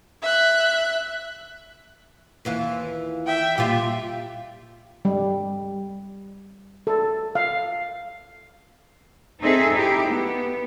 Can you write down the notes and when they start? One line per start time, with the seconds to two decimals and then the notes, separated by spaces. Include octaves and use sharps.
0.23 E5 F#6
2.45 D#2 E3 F4
3.27 E5 G5
3.58 A#2 G3 F4 G4 E5
5.05 G3
6.87 A4
7.35 F5
9.41 C4 D#4 G#4 A4 E5
9.73 D#4 E4 G4
10.08 B3